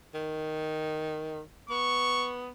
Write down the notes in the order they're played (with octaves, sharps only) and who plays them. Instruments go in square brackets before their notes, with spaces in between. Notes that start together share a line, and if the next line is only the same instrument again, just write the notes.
[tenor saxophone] D#3
[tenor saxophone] B3 [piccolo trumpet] C#6